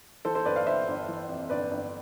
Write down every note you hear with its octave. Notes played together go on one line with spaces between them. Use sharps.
E3 A4 C5
A4 C5
G1 B4 D5
D5 F5
G1 C5 E5
G1
E3
F2
G1 B4 D5
G1